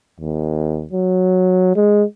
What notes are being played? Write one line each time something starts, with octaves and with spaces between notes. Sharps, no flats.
D#2
F#3
G#3